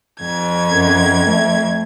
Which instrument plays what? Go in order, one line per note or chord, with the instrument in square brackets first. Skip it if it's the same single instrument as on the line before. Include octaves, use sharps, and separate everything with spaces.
[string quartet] F2 G#6
[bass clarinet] F#2
A3